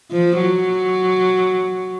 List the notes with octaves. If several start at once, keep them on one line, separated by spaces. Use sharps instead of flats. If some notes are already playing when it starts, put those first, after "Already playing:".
F3
F#3